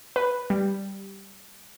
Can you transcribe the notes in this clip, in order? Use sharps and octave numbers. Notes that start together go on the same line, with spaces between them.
B4
G3